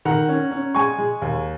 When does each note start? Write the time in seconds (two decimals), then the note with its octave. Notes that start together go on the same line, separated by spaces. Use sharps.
0.05 D#3 F#5 A#5
0.29 C#4
0.51 C#4
0.75 G#3 G#5 C#6
0.98 G#3
1.22 D#2